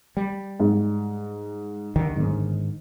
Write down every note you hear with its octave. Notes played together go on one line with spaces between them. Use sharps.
G3
G#2
D#2 D3 D#3
G1 G#2 D#3